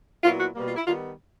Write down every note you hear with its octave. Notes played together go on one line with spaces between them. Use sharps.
A#2 F#3 B3 E4 F4
F#4
B2 G3 A#3
F4
E4
D#3 G3 B3 F4